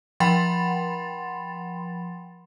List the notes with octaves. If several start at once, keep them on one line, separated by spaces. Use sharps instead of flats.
F3 F#5 G5 B5 C6 A6